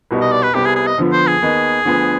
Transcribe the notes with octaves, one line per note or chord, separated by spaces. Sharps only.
C2 B2 G3 B3 D#4
D#5
D5
B4
C2 C3 G3 B3 G4
G#4
G#4
D#5
F2 D3 F3 B3
C5
G#4
D#2 D#3 B3 D#4
D2 D3 F3 B3